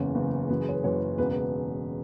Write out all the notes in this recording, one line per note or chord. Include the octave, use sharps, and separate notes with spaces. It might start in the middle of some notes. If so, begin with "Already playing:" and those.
Already playing: F#1 E2 C#3 C#5
F#1 E2 C#3
F#1 F#2 E3 B4
G#4
C#5
B4
F#1 F#2 E3 C#5
E1 E2 C#3 B4
B4